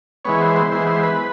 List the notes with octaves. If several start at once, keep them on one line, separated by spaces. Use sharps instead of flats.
E3 G#3 B3 C#5
C5
C5
E3 G#3 B3 C5
C5
B4